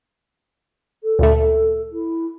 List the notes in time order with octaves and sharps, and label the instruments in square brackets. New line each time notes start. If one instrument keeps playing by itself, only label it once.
[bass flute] A4
[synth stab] D2 A#2 A3
[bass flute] E4